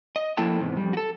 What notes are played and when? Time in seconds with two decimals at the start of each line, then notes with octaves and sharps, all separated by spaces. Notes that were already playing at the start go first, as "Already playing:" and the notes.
0.16 D#5
0.37 F3 A#3 E4 A4 G5 A5
0.60 E2 G#2 C3
0.77 F2 G3
0.93 F#4 A4